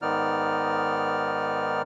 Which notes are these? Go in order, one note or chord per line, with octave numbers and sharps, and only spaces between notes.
G#2 D#3 B3 D#4 D5 F6